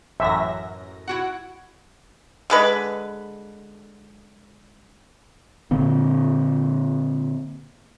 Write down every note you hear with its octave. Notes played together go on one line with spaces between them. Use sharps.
A1 F#2 E5 A#6
E4 F#4 F#5
D3 G#3 B4
A#2 D3 A#3 C4